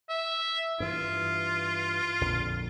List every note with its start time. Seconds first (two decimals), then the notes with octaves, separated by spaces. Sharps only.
0.09 E5
0.80 G2 E3 F4
2.21 A#1 F2 D3